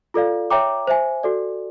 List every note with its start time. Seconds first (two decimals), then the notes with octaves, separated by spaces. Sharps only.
0.14 F4 A4 D5 F5
0.51 C#5 E5 G5 A#5 D6
0.87 C5 E5 G#5
1.23 F#4 A4 D5